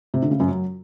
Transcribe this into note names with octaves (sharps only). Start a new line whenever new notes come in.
C3
D3
C#3
F#2
F#3